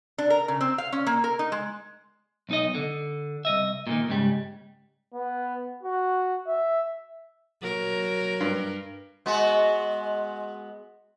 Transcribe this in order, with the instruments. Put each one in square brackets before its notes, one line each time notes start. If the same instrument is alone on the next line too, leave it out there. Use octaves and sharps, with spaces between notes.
[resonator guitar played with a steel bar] D4
A#4
C#3
C4
F5
C#4
A#3
A#4
D#4
G#3
[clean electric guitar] B1 D#4 D#5
D3
C2 D#5 E5
A#2 D3 D#3
G#2 C#3 G3
[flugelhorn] B3
F#4
E5
[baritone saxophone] F#3 [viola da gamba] A#4
[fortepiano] G2
[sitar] G#3 B3 F#4